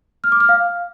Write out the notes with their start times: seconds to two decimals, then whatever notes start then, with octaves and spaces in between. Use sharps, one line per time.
0.24 F6
0.32 D6
0.40 F6
0.49 F5